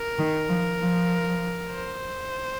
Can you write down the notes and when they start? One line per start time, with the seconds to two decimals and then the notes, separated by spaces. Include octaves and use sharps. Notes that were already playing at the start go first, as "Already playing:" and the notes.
Already playing: A#4
0.19 D#3
0.49 F3
0.80 F3
1.71 C5